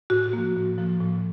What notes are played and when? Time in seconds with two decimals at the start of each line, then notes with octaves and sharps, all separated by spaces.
0.10 A2 F#4
0.33 F3 A#3
0.56 A2
0.78 F3 A#3
1.00 A2